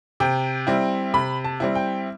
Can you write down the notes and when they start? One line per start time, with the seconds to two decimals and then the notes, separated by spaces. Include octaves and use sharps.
0.20 C3 G5
0.67 G3 C4 E4
1.14 C3 B5
1.44 A5
1.60 G3 C4 E4
1.75 G5